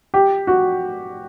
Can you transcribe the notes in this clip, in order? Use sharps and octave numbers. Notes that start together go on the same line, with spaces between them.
G4
F#4